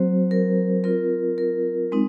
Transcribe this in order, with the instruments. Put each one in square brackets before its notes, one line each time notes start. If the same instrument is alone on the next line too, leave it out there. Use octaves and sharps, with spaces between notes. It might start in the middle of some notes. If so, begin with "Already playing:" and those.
Already playing: [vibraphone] F#3 C4 F#4 C5
A#4
C4 F4 A#4
A#4
G#3 C4 D#4